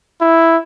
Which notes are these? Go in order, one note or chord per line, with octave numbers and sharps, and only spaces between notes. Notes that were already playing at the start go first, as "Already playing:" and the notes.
E4